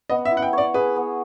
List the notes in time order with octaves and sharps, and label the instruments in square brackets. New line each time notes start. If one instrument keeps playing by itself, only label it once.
[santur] B3 [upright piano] D#5
[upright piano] E5
[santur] E4
[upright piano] F#5
G5
[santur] C#5 [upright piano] D5
[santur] G#4 [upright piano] B4
[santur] B3